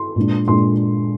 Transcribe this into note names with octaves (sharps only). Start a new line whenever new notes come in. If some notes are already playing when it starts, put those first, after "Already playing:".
Already playing: C6
A#2 G#3 D4
A#2 G#3 D4 C6